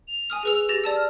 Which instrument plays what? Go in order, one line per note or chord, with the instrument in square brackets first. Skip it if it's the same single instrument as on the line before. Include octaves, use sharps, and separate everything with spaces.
[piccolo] F7
[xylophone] G#5 D#6 F6
G#4 B4 E6
G4 A6 A#6
D5 A5 E6
[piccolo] F6